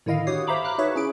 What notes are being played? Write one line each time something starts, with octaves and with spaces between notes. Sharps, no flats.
A2 D3 D#3 E4 D#5 F5
G2 F#4 G4 C#5 D#6 C7
C5 E5 F5 A#5 B5 D6
A#5 B5 D6 F6 F#6
D#4 F#4 G#4 B4 C#5 E5
C#4 E4 G#4 D7